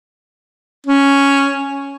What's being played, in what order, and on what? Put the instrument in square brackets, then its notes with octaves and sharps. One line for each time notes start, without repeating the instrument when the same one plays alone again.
[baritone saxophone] C#4